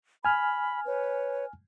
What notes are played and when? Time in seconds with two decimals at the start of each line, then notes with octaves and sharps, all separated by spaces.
0.25 G#5 B5 F6
0.86 B4 C#5